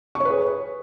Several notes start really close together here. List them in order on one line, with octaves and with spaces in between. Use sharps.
C#6 C#5 B4 G#4